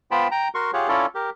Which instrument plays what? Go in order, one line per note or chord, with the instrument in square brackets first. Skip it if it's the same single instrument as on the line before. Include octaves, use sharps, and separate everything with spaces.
[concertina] B3 F4 C5 G5 A5 B5
G5 A#5
F#4 A#4 C6 C#6
F4 G4 G#4 C#5 F#5
C#4 E4 F4 A4 C#5 D5
G4 A#4